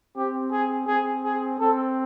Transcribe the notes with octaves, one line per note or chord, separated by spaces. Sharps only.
C4 G4
G#4
C4 G#4
G#4
C4 A4